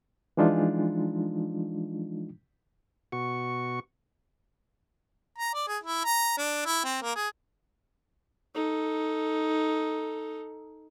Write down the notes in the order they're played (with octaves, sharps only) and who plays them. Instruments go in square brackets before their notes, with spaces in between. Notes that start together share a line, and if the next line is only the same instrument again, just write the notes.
[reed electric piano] E3 F3 G#3 D4 D#4 F4
[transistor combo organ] B2 F#4 C#6
[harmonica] A#5
D5
G#4
E4
A#5
D4
E4
C4
A#3
G#4
[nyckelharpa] D#4 A4